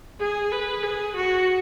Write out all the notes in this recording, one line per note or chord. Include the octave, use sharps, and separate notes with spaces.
G#4
B4
G#4
F#4